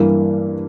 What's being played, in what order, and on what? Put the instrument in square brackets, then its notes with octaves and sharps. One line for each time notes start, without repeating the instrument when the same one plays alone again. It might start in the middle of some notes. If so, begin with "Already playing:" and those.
Already playing: [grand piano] G2 E3 A#3